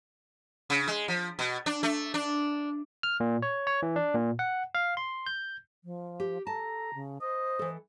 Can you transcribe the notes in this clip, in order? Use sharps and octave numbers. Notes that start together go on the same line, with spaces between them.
C#3
G#3
F3
B2
D4
A3
D4
F6
A#2
C#5
C#5
E3
D4
A#2
F#5
F5
C6
G6
F3
G4
A4 A5 A#5
C#3
C5 D#5
E3 A4